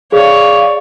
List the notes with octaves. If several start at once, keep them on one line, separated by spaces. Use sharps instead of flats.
G#4 C#5 D5 F5